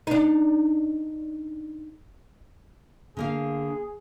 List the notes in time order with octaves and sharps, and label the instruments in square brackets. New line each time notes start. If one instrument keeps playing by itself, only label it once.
[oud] D4 D#4
[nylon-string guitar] D3 A#3 F5 [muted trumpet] G#4